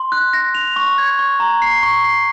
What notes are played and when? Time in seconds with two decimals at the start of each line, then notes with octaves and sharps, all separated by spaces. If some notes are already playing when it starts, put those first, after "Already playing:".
Already playing: C6
0.12 F#6
0.33 A#6
0.55 F7
0.76 C#6
0.98 G#6
1.19 C#6
1.40 A#5
1.62 C7
1.83 C#6
2.04 C7